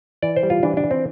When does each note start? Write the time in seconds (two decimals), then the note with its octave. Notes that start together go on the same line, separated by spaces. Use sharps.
0.22 E3 D5
0.36 C5
0.43 G3
0.50 F4
0.63 E3 D4
0.77 D4
0.84 E3
0.91 C4